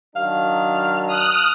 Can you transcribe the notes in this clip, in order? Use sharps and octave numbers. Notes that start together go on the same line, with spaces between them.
D#3 F#3 D4 F5
D#6 F6 F#6